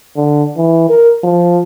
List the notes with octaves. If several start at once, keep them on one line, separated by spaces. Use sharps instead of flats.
D3
E3
A#4
F3